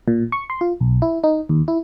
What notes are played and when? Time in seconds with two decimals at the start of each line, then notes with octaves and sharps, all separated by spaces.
0.08 A#2
0.32 C#6
0.50 C6
0.61 F4
0.81 B1
1.02 E4
1.24 D#4
1.49 D#2
1.68 E4